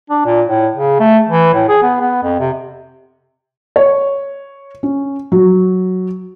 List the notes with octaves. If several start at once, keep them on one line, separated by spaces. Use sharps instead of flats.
D4
A#2
A2
C#3
A3
E3
A2
G#4
B3
B3
F2
C3
C#5
C#4
F#3